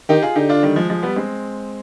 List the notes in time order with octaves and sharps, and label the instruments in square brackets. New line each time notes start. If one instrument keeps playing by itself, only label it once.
[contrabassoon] D#3 [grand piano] D#4 G4
[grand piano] F4 G#4
[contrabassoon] D3 [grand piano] D#4 G4
[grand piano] D4 F4
D#3 G3
F3 G#3
F3 G#3
G3 B3
G#3 C4